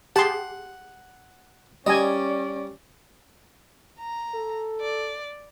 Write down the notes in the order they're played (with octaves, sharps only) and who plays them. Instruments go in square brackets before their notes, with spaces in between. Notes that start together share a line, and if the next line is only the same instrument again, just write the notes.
[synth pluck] G4 G#4 [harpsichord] F#5 [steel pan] A5 C6
[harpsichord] G3 [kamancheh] C#4 D5 [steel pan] D#5 G#5
[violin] A#5
[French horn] A4
[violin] D5